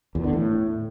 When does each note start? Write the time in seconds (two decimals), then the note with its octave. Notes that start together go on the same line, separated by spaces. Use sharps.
0.15 E2
0.24 D3
0.33 A2